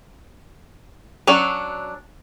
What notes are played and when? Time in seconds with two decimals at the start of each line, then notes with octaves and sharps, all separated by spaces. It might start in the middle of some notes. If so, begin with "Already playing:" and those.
1.27 F#3 C#4 D4 C#5